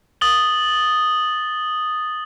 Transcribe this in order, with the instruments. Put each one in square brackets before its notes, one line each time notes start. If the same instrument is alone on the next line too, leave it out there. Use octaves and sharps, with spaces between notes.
[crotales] D#6 A6 F#7 G7